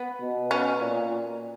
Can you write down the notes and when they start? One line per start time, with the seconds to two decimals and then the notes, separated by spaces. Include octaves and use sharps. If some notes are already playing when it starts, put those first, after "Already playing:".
Already playing: B3
0.21 B2
0.51 C#4
0.80 A#2